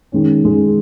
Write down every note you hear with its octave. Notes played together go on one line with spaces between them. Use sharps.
D#3 G#3 C#4
D#3 G#3 C#4